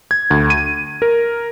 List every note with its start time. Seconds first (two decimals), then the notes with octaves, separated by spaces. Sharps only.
0.11 G#6
0.31 D2
0.50 D#7
1.02 A#4